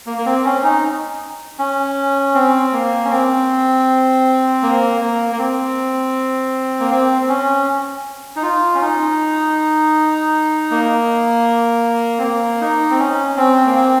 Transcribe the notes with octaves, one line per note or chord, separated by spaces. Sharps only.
A#3
A#3
C4
C#4
D#4
C#4
C4
A#3
C#4
C4
A#3
A#3
A#3
C4
A#3
C4
C4
C#4
D#4
F4
C#4
D#4
A#3
C4
A#3
D#4
C4
C#4
C4
A#3
C4